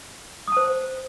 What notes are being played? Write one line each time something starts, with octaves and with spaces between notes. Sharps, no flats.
C5 A5 D#6